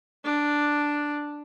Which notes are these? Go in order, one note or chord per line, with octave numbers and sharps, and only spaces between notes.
D4